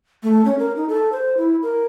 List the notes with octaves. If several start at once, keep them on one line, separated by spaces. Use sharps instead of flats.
A3
C#4
A#4
D#4
A4
C5
E4
A#4